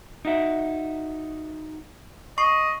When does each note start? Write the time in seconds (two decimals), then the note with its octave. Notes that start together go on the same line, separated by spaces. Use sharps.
0.25 D#4 F#4 E5
2.38 D#5 C#6 C7